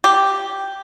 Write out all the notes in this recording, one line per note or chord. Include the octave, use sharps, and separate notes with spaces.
G4